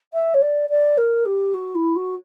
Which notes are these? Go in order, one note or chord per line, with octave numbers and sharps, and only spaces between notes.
E5
C#5
D5
D5
A#4
G4
F#4
E4
F#4